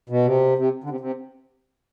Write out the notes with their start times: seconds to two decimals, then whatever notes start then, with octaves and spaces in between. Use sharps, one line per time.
0.10 B2
0.25 C3
0.58 C3
0.84 D3
0.90 C3
1.00 C3